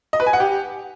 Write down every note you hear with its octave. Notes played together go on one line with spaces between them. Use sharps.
D#5
B4
G#5
F#5
G4